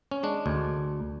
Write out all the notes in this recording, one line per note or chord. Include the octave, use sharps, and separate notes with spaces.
C#4
G#3 D4
D2